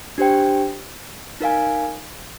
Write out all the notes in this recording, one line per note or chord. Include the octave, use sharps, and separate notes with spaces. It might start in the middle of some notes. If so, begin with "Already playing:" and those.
D4 G4 C5 G5
D#4 A#4 F5 G#5